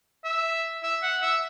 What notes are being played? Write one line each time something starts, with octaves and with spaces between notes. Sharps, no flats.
E5
E5
F#5
E5